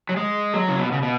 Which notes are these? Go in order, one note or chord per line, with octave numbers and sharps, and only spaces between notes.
F#3
G#3
F#3
C#3
B2
C#3
B2